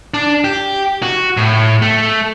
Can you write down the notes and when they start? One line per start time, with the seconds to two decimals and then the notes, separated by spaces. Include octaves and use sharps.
0.14 D4
0.44 G4
1.03 F#4
1.37 A2
1.82 A3